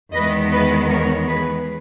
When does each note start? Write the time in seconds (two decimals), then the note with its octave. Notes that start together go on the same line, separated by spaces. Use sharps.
0.13 E2 D#3 G#3 B3 B4 D#5
0.52 B4 D#5
0.90 A#4 C#5
1.27 G#4 B4